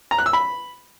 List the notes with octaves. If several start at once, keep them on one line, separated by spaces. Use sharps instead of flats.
A#5
F#6
E6
B5